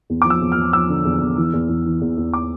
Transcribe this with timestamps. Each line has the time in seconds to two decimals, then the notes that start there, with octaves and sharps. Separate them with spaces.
0.10 E2
0.22 F3 D6
0.30 E6
0.42 E2
0.52 F6
0.57 E2
0.73 F3 E6
0.89 D3
1.05 E2
1.21 E2
1.38 E3
1.53 E2
1.69 E2
1.86 E3
2.01 E2
2.17 E2
2.34 D6